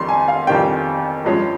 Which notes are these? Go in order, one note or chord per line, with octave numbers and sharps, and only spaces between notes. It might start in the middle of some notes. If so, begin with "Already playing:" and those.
Already playing: F2 D#3 G3 C6
G#5
F5
F2 D#3 G3 G5
G2 F3 G#3 C#4